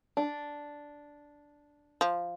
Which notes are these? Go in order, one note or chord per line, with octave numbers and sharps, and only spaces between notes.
D4
F3